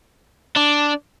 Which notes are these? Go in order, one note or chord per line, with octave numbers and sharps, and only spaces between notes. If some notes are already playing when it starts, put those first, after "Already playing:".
D4